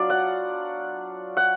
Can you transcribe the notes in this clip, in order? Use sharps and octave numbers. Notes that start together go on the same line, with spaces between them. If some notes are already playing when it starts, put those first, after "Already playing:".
Already playing: F#3 B3 D4 F4 D5
F#5
F#5